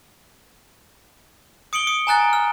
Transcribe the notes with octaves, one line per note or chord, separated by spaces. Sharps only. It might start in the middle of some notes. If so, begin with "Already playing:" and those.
D#6 C#7 D7 F#7 G7
D#6 C#7
G#5 A#5 F#6 A6
F6